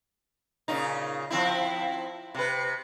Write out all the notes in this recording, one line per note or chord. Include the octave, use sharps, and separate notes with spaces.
A#2 C#3 D#4
F3 C4 E4
C3 B4